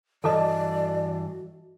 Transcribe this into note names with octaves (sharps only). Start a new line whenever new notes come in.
G2 E3 F#4 A4 D5 D#5 A5